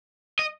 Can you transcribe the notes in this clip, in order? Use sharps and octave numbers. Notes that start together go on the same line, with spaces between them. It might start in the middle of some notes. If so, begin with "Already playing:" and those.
D#5